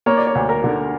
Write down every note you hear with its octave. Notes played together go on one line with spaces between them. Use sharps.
A#3 C#5
D5
C#5
D2
A#4
D3